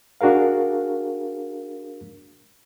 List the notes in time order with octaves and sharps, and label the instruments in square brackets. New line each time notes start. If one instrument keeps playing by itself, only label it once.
[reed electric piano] D4 F#4 G#4 A#4 F5